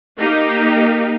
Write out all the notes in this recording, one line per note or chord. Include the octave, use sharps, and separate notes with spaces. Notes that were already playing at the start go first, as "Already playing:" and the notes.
A#3 D#4 G4